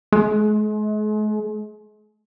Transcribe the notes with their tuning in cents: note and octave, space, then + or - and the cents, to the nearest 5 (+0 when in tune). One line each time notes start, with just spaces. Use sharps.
G#3 +40